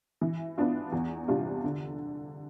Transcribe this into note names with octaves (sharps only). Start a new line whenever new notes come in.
E3
B3 D4 F4
E2
C3 G3 D4 F4
D3